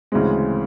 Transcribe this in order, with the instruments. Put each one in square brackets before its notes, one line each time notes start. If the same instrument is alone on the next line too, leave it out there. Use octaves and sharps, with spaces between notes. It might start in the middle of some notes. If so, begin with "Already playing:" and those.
[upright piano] D2 C#3 E3 G#3 C4